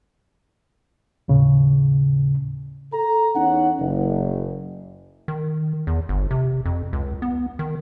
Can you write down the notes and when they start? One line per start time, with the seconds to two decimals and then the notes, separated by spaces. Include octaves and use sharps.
1.28 D#2 A2 C#3
2.93 A4 A#5
3.35 E2 C#4 D#4 F#5
3.79 F#1
5.28 D#3
5.87 E2
6.09 G1
6.31 C3
6.65 F2
6.93 C#2
7.22 B3
7.59 D#3